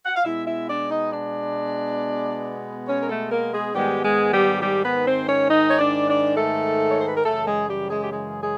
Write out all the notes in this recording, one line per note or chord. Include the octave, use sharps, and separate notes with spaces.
F#5
F5
B2 G#3 B3 E4 E5
E4 E5
D4 D5
D#4 D#5
D4 D5
C#4 C#5
A#4
A3 A4
A#3 A#4
G#3 G#4
G#2 D#3 G3 G#3 B3 G4
G#3 G#4
G3 G4
G3 G4
B3 B4
C4 C5
C#4 C#5
D#4 D#5
C#5
D4 D5
D4 D5
A3 A4
C#5
C5
B4
A#4
F#2 C#3 E3 A3 A4
G#3 G#4
G3 G4
G#3 G#4
G4
G#3 G#4
G#3 G#4